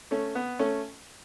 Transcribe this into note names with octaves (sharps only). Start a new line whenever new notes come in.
A3 C#4
B3
A3 C#4